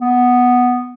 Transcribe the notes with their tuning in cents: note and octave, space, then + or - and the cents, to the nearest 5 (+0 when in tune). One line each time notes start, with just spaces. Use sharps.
B3 +0